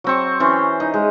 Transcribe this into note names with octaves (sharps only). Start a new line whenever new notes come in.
F#3 C4 C#6
E3 C#4 C5
D#4
G#3